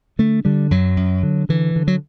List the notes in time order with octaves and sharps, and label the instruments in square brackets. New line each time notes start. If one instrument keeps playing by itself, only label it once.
[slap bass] D3 A3
D3 G3
F#2 F#3
F#2
D3
D3 E3
D3
F#3